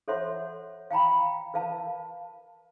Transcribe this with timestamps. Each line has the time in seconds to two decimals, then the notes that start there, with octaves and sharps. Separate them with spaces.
0.08 A4 C5 C#5 E5 F#5 C6
0.91 F5 G5 A#5 B5
1.54 A#4 B4 F5 A5